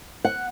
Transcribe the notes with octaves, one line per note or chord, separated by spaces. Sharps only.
F#5